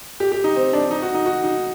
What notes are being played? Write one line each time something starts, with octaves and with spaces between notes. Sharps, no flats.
G4
G4
D#4
C4
D4
D#4
F#4
D#4
F#4
D#4